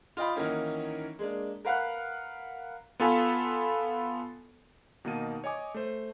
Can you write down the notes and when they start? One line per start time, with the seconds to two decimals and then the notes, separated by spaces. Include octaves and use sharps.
0.17 F4 D#5 G5 B5
0.35 D#3 E3 F#3 A#3 C#4 D#4
1.19 G#3 A#3 D4
1.65 A#4 B4 F5 F#5 F6 F#6
3.00 B3 F4 A4 G#5 B5
5.05 B2 D#3 A#3 D#4 A5 D#7
5.44 C#5 D#5 G#5 D6
5.74 A3 C5